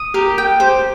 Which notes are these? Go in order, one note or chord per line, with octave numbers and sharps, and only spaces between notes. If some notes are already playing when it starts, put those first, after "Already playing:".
Already playing: D#6
G4 A#4
G5
G4 C5